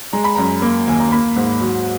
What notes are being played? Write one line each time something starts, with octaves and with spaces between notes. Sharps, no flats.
G#3 A#5
B5
F#2 A#5
A#3
D#2 G#5
A#5
A#3 B5
G#2
F#3